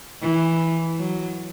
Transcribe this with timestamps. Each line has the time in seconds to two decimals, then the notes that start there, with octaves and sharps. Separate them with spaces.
0.21 E3
0.98 F#3